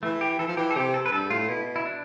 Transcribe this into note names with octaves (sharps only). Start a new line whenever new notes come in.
E3 A3
G4
E3 A4
F3
E3 G4
A4
C3 G4
A4
B4
G2 A4
A2 F4
B2 E4
E4
D4